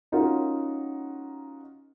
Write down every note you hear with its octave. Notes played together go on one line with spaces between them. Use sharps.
C#4 D#4 F4 F#4 A#4